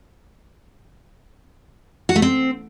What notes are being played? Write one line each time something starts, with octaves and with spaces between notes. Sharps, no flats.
F#4
A3
C4